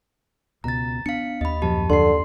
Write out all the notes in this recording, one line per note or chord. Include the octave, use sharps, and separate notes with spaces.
C#2 B2 A#5 A6
B3 D4 F5 C#7
D#2 D#5 B5
F#2 A#2 F3 G4 A5
D#2 D3 C6 C7